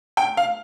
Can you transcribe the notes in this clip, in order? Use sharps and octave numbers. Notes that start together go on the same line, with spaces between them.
G5
F5